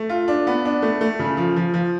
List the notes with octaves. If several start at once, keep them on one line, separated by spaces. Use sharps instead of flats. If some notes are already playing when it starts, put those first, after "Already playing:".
Already playing: A3
F4
D4
B3
D4
A3
A3
C#3
F3
F3
F3